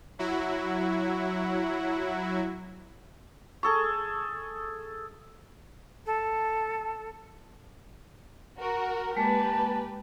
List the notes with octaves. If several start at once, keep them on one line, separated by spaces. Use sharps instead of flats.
F#3 E4 F#4
G#4 A4 C#6
A4
F#4 A#4
G#3 A#3 G4 B4 A5